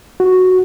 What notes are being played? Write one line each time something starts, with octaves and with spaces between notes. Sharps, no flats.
F#4